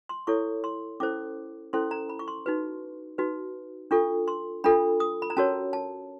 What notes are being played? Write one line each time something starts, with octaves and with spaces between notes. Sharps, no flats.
C6
E4 A4 C#5 C#6
C6
C#4 E4 A4 C5 D6
C#4 E4 A4 C5 C6
A#5
B5
C#6
C6
D#4 F#4 B4
D#4 F#4 B4
D4 F4 A4 C#6
C6
D4 F4 A4 B5
D#6
B5
A#5
C#4 F#4 A#4 C#5 A5
A5